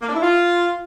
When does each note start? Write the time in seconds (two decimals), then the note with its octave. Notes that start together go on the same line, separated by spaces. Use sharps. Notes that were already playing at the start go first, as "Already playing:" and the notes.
0.02 A#3
0.08 D4
0.15 E4
0.22 F4